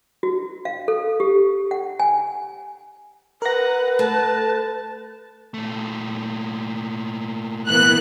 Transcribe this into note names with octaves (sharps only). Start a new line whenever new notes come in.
F#4
F5
A4
G4
F#5
G#5
A#4 B4 F#5 A#6
A3 A5
A#2 A3
E3 A#3 B3 F#6